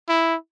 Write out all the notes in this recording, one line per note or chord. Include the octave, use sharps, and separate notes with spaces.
E4